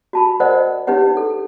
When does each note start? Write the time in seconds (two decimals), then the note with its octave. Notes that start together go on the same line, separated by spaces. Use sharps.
0.13 F#4 A5 B5
0.40 A#4 C5 D5 D#5 F#5
0.87 D4 D#4 G4 B4 C#5 F#5
1.17 A4